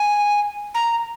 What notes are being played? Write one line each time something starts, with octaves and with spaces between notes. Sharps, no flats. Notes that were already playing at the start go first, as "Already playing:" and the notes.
Already playing: G#5
A#5